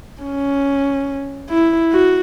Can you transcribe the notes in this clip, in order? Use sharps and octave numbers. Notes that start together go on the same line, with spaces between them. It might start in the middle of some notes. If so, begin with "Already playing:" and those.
C#4
E4
F#4